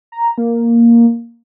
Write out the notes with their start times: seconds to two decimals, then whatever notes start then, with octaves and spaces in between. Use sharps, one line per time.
0.12 A#5
0.38 A#3